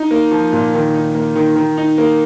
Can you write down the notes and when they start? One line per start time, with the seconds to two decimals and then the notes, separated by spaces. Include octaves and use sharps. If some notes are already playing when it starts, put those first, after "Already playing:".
Already playing: D#4
0.11 A#3
0.31 F3
0.53 A#2
0.74 D#3
0.95 D#4
1.15 A#3
1.36 D#3
1.56 D#3
1.78 D#4
1.98 A#3